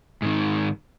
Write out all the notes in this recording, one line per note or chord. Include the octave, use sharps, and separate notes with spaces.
G#2 D#3